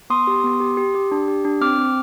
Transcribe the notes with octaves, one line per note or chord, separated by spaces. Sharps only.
B3 C6 D#6
G4
B3
G4
G4
G4
D4
G4
D4
C4 D6 F6
C4